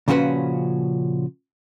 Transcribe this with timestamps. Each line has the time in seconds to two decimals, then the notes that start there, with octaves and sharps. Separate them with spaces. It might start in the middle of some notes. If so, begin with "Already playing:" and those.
0.08 A#2 C#3 F3 C#4 F#4 B4